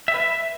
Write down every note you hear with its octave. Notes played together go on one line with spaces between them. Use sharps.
E5
B4
E5